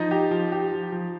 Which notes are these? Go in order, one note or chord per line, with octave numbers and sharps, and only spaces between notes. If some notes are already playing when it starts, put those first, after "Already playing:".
Already playing: F3 D#4 D#5
G4
F3
G4
F3
F3